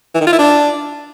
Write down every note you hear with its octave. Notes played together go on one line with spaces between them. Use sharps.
E3
D#3
F4
E4
D4